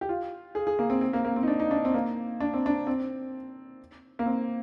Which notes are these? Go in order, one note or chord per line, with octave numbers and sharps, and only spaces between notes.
G4
F4
G#4
G#4
A#3
C4
C4
A#3
A#3
C4
D#4
D4
D#4
D4
C4
A#3
D4
C4
D4
C4
A#3
C4